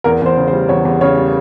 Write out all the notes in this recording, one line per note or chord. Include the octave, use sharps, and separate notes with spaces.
E2 A#4
E2 C5
C#3
C5
G3
E2 C#5
E2
C#3 C#5
G3